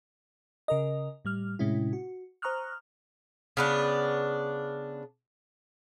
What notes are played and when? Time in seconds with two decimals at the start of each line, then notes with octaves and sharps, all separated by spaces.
0.68 C#3 A#4 D#5
1.25 A2 G3 F6
1.59 A2 C3 G#3 C#4 E4
1.93 F#4
2.42 C5 A#5 C#6 D#6 F6 F#6
3.57 C#3 B3 D4